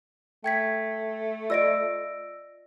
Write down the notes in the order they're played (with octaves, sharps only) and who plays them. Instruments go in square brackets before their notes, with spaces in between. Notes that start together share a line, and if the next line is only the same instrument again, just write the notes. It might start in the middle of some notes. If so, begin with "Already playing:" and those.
[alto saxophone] A3 [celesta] G5 G#6 B6
[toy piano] F4 D5 D#5 [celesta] E6 A#6 D7